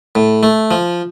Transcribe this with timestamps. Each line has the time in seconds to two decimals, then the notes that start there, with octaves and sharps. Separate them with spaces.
0.15 A2
0.43 A3
0.71 F3